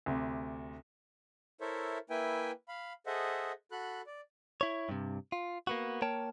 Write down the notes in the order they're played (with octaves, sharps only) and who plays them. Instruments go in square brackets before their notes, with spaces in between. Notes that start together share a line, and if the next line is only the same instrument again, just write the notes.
[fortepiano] D2 C3
[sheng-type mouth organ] E4 A4 A#4 C5 C#5 E5
A#3 E4 B4 E5 G5 G#5
F5 B5
G#4 A4 C5 D#5 E5 F#5
F#4 A4 B5 F#6
D5
[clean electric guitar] E4 C#5
G2 C3
F4
A#3 B3 F#4
A#3 A#4 C#5 G5 A5